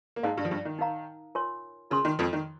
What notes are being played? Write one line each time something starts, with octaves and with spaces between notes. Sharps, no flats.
A#3
G#2 G#3 D#4 A#4 F5 A#5
G2 G3
F3
G2 G3
D#3
D#4 A#4 F5 A#5
F4 A#4 C#5 G#5 C6
C#3 F4 A#4 C#5 G#5 C6
D#3
F2 F3
D#3